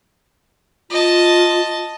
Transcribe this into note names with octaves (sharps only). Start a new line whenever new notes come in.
F4 D#5 A5